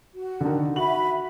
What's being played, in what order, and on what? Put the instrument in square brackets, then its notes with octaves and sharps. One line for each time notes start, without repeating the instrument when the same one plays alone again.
[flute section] F#4
[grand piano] D3 D#3
[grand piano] F#4 F#7 [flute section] E5 B5